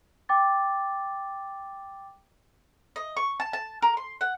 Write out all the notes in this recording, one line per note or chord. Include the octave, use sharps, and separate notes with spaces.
G5 D6 A6
D#5
C#6
A5
A5
A#4
C6
F#5